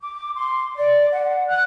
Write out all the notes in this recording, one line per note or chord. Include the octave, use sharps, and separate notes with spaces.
D6
C6
D5
F#5
F#6